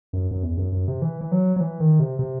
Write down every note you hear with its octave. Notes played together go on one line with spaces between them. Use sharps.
F#2
F#2
E2
F#2
F#2
C3
E3
E3
F#3
F#3
E3
D#3
C3
C3